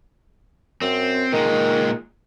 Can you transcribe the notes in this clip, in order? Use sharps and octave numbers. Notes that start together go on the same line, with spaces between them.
F#2 C4
A#2 D#3 G#3